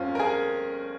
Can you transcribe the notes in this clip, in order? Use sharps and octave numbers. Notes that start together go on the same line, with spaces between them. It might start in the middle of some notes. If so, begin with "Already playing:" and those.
Already playing: G1 F2 C4 C#4 F4
A#4
G#4